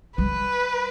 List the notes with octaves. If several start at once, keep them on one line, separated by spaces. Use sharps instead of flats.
G3 B4